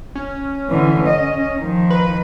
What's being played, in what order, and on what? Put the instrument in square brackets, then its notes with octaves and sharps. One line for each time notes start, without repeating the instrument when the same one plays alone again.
[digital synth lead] C#4
[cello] D3 E3
D#5
D#3 F3
[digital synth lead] B4